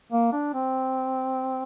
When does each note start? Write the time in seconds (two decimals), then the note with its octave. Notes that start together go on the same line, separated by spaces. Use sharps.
0.12 A#3
0.32 D4
0.54 C4